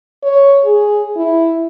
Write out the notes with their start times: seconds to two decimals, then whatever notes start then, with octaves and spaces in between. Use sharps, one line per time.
0.23 C#5
0.65 G#4
1.16 E4